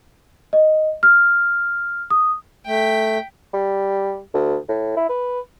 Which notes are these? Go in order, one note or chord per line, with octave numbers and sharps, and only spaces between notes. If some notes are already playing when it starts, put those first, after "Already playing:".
D#5
F6
D#6
A3 G5 B6
G3
D2
A2
E4
B4